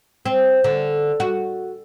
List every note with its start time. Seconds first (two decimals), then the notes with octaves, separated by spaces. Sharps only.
0.26 C4
0.64 D3
1.20 F#4